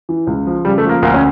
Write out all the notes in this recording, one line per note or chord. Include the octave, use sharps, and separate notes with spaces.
E3
C#2
F3
C#3 G3
A3
F3
A#3
D2 A#3
C#4